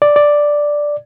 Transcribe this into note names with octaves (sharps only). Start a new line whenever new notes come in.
D5
D5